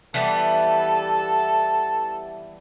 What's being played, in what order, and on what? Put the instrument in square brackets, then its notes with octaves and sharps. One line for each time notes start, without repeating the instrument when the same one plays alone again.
[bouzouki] E3 G3 B3 [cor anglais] A4